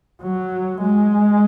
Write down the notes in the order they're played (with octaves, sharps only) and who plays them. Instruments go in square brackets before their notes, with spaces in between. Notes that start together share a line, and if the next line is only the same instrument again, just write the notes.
[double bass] F#3
G#3